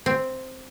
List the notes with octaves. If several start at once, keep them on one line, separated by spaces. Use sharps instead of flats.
C4